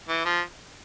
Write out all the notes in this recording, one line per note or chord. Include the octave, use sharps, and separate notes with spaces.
E3
F3